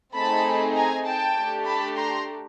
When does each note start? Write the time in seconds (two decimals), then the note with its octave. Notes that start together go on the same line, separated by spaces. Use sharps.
0.15 A3 C4 D#4 G#4 A5 B5
0.75 G#5 A#5
1.05 G5 A5
1.36 A3 D4 G4
1.66 A5 B5
1.97 A#5 C6